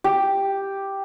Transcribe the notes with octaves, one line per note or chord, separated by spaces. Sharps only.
G4